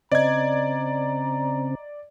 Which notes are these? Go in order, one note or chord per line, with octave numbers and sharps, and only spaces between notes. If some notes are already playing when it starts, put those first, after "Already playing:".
C#3 C4 D5 D#5 A#5 G#6